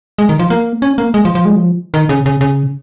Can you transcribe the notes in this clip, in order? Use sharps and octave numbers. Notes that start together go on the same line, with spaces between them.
G#3
D#3
F3
A#3
C#4
A#3
G#3
F3
F3
G#3
F3
D#3
C#3
C#3
C#3